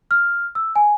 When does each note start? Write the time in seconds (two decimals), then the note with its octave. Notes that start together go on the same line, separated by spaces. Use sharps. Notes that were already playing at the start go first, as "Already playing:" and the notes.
0.11 F6
0.55 E6
0.76 G#5